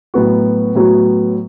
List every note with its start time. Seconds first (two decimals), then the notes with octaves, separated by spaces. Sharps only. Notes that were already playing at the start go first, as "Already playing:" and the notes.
0.14 A2 F#3 B3 F#4
0.75 A2 F#3 B3 F#4